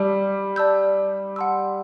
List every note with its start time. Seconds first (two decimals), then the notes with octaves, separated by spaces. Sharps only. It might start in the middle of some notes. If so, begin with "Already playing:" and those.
Already playing: G3 D5 A5 E6
0.56 D5 A5 E6 G6
1.36 F#5 A5 C6 E6